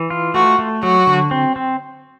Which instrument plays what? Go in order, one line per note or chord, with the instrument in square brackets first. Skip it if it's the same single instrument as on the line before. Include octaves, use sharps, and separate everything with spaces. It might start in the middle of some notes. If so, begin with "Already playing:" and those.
Already playing: [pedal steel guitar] E3
F4
[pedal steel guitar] A3 [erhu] F#4
[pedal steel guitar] A3
[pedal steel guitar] F#3 [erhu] F#4
[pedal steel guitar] D3
C4
C4